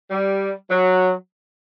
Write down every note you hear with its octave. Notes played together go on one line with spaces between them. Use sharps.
G3
F#3